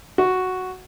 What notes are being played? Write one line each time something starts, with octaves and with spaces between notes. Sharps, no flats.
F#4